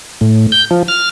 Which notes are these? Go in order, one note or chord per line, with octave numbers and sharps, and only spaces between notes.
A2
G6
F3
F6